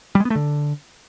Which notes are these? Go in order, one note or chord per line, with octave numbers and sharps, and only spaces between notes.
G3
G#3
B3
A3
D3